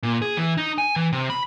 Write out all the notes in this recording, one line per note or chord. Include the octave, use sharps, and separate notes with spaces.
A#2
G#4
E3
D#4
G#5
E3
C3
B5